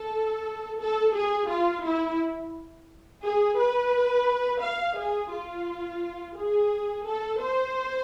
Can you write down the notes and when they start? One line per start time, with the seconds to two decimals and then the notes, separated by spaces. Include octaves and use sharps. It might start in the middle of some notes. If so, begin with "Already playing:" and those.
Already playing: A4
0.81 A4
1.15 G#4
1.50 F4
1.85 E4
3.24 G#4
3.59 B4
4.63 F5
4.98 G#4
5.32 F4
6.37 G#4
7.07 A4
7.42 C5